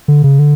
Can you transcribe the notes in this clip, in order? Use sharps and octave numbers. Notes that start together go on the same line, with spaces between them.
D3
C#3
D3